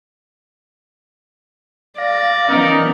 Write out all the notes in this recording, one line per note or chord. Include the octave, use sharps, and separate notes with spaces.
D5 F5 A#6
E3 B3 C#4 D#4 A#4